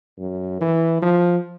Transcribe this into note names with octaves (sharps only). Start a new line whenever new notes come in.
F#2
E3
F3